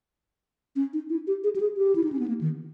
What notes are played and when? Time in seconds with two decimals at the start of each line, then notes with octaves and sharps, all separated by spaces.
0.76 C#4
0.93 D#4
1.10 E4
1.27 G4
1.44 G#4
1.56 G4
1.60 G#4
1.77 G4
1.96 E4
2.04 D#4
2.12 C#4
2.19 B3
2.28 A#3
2.41 D#3